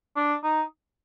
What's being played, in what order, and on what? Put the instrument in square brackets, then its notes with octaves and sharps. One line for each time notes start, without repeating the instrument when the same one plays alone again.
[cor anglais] D4
D#4